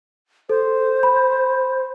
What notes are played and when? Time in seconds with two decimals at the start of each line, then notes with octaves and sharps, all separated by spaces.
0.49 A4 C5
1.03 B5